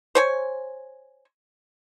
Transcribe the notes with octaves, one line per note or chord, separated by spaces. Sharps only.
C5 C#5 G#5